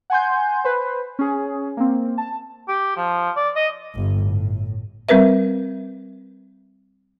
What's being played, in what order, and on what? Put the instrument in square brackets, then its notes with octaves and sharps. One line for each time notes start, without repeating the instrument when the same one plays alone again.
[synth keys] F#5 G#5 C6 G6
B4 C5
C#4 G#4
A#3 C4
A5
[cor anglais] G4
F3
D5
D#5
[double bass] G1 G2
A2
[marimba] G3 C4 A#4 B4 E5